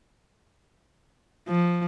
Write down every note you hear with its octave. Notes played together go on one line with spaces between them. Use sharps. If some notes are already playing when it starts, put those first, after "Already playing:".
F3